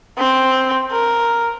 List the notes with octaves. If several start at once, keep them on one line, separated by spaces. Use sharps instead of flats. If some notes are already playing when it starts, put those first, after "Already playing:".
C4
A#4